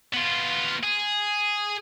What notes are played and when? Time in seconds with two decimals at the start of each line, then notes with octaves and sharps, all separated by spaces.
0.13 B3 F4
0.83 G#4